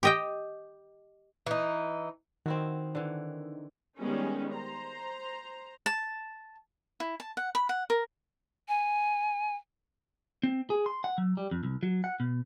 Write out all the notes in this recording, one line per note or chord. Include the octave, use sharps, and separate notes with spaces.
G4 D#5 G5
E3 D#4
D#3 C4 E4 F#4
D3 E3
D#3 G3 G#3 B3 C#4 D#4
C5 A#5
A5
E4
A5
F#5
B5
F#5
A#4
G#5
C4
G#4
C6
F#5
F#3
G3
F2
C2
F#3
F#5
B2